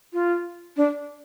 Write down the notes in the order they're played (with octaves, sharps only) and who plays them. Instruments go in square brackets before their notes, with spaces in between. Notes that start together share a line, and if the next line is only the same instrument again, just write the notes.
[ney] F4
D4